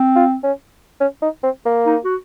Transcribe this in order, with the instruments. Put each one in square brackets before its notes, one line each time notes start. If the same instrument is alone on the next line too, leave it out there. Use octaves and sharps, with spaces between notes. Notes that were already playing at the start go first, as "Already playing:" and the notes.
Already playing: [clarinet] C4
[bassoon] F4
C#4
C#4
D#4
C4
A#3
[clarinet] D#4
F#4